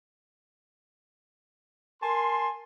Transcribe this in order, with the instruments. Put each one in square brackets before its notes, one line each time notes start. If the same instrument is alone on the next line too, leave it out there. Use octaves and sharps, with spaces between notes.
[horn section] A#4 G#5 A5 C6